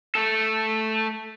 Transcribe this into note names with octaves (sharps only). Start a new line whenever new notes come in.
A3 A4